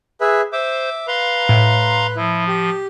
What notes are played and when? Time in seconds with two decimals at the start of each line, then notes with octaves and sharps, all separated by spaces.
0.21 G#4 B4 E5
0.53 C5 E5 D6
1.07 B4 F5 A#5 C6
1.49 A2
2.16 F3 E4
2.48 G4